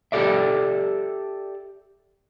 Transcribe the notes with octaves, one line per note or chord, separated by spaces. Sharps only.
G4 A4 D5 E5